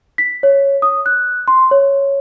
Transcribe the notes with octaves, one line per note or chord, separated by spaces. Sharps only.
B6
C#5
D#6
F#6
C6
C#5